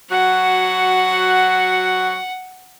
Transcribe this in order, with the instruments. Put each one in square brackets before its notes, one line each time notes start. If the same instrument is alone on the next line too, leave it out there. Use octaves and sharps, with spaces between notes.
[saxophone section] F#3 F#4 [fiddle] F#5